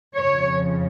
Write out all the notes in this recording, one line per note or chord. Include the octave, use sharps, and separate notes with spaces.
F2 C#3 F3 C#5